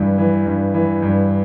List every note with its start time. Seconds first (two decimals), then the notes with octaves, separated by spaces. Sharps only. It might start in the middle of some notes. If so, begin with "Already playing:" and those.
Already playing: G2 E3
0.18 E3
0.46 G2
0.74 E3
1.02 G2